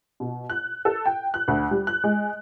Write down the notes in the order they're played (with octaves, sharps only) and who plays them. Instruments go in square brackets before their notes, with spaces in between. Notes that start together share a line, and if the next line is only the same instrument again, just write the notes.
[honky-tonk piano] B2
F#6
A4
G5
F#6
D2
G3
F#6
G#3